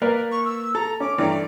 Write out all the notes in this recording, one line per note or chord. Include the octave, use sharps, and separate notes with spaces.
A#3 A#4 B4 D5
C#6
E6
A4 A#5
C#4 D6
G2 E3 A3 D5 A#5